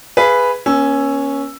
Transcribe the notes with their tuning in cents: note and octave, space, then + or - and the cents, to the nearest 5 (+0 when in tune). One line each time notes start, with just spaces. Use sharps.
G#4 +0 B4 +0 F5 -35
A#3 +45 C#4 +0 E6 +5